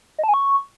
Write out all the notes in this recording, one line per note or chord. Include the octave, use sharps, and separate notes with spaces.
D#5
A5
G#5
C#6